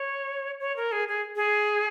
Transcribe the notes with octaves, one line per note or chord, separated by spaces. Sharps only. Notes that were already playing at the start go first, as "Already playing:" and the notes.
Already playing: C#5
C#5
A#4
G#4
G#4
G#4